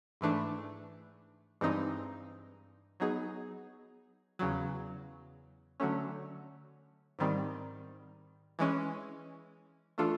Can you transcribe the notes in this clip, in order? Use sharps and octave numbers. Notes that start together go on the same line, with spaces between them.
G#2 E3 A3 D4
G2 E3 G#3 C4 D#4
F#3 B3 D#4 G#4
E2 C#3 F#3
D3 F#3 A3 C#4
G#2 D#3 G3 C4 D#4
E3 G#3 C#4
E3 A3 D4 F4 A4